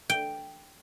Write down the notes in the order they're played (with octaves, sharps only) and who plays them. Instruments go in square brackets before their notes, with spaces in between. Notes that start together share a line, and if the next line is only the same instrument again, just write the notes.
[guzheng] G5